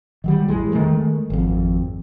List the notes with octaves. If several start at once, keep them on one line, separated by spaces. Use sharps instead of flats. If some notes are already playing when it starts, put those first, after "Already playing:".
D#3 F#3 G3
A1 E2 E3 G#3
D#3 F3 G#3 A3
G#1 F2